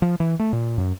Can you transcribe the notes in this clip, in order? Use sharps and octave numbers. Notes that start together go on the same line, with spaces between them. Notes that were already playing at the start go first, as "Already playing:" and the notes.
F3
E3
A3
A#2
F#2